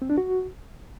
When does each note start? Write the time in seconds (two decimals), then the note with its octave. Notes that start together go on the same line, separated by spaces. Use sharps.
0.02 C4
0.10 D4
0.18 F#4